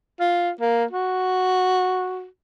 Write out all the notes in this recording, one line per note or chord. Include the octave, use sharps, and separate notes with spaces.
F4
A#3
F#4